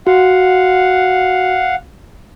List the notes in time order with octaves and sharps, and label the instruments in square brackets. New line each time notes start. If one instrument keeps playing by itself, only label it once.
[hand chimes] F#4 [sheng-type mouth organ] F5 F#5